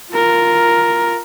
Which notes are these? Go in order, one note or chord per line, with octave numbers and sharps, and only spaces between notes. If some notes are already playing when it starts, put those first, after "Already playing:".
F4 A#4